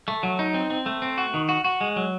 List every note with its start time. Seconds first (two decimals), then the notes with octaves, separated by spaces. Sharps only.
0.08 A3
0.23 F#3
0.39 D#4
0.54 C4
0.70 C4
0.86 A3
1.02 C4
1.18 F#4
1.34 D#3
1.49 F#4
1.64 F#4
1.81 G#3
1.96 F#3